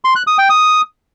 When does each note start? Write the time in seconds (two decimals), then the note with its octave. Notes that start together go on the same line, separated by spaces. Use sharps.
0.05 C6
0.16 F#6
0.27 D#6
0.38 G5
0.50 D#6